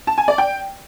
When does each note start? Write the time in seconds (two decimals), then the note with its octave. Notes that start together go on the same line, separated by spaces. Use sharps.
0.07 A5
0.18 G#5
0.28 D5
0.38 G5